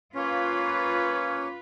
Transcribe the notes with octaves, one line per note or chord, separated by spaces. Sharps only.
A#3 C#4 F4 B4 C#5